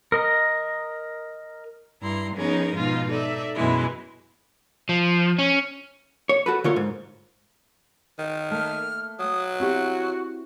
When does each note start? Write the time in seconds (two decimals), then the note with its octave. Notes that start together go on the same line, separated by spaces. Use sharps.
0.12 A#4 D#5 A#5
2.00 G2 E4 A#5 C6
2.36 F3 B3 C#4 D#4 G#4 A#4
2.75 G#2 B2 F3 D#4 F4
3.10 D#4 A4 D5 E5
3.55 F#2 B2 E3 G#3 E4
4.89 F3
5.39 C#4
6.29 C#5
6.46 F#4 A4 B4
6.64 D3 A3 F4 A#4 C#5
6.76 G#2
8.19 D#3
8.51 A3 A#3 F6
9.19 F#3 D#6
9.60 C4 E4 F#4 G4